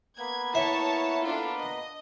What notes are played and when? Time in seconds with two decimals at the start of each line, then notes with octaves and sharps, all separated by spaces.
0.19 A#3 B3 B4 G#6
0.55 E4 C#5 E5 A5
1.24 D4 F4 A4
1.58 D#5